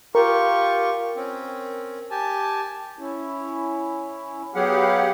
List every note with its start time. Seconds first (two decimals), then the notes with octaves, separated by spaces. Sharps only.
0.15 F4 G4 A#4 C#6
1.16 C4 C#4
2.11 G4 G#5 A5
2.99 C#4 E4
4.55 F#3 B3 G4 G#4 F5 F#5